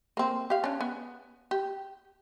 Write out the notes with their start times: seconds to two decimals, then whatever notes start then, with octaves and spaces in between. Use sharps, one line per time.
0.17 A#3 C4
0.50 G4 F5
0.64 C#4 D4
0.81 B3
1.51 G4